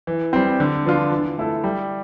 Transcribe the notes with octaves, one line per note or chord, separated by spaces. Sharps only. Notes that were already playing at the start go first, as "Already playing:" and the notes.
E3
G3 C4
D3
F3 B3 D4 F4
E3
A3 E4 A4
G3